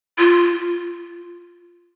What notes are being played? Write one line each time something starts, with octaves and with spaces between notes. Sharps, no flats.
F4